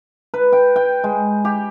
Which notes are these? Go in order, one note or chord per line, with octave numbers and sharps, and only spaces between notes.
B4
G5
G5
G#3
G4